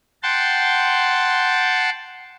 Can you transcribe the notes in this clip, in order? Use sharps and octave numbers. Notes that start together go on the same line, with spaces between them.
F#5 G5 A5 C6